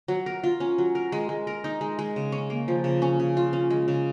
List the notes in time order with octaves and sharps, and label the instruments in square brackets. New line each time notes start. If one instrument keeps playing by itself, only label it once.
[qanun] F#3
A#4
F4
C#4
F#3
A#4
G#3
G#3
A#4
D#4
G#3
G#3
C#3
C#4
A#3
F3
C#3
C#4
C#3
F4
C#4
G#3
C#3